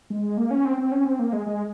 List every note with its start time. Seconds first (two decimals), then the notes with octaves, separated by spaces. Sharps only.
0.10 G#3
0.37 A#3
0.51 C#4
0.65 C4
0.78 C4
0.92 C#4
1.05 C4
1.19 A#3
1.33 G#3
1.46 G#3